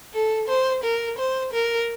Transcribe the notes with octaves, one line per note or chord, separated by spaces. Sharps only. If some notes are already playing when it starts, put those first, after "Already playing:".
A4
C5
A#4
C5
A#4